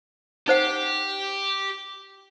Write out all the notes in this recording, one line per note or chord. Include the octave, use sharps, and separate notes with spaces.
D#4 G4 C5 F#5